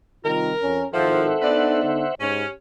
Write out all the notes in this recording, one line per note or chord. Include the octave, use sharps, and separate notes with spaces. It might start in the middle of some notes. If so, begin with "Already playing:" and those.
C3 D#3 G3 F4 A#4
F2 C#4
G#1 A2 D#3 F3 A4 C5 E5 F#5
D2 B3 D4 D#4 B4 D5
D3
G#2 C#4 G4 C#5